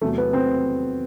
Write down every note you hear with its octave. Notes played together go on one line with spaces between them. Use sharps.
E2 C3 F#3 A3
B3
C4